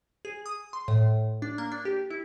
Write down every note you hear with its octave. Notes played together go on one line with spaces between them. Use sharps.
G#4
D#6
C6
A2
D4
A#3
D4
G4
E4